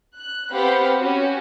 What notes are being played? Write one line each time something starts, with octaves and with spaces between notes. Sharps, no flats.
F#6
B3 C4 G4 F5 F#5 B5
C#4 F#4 G4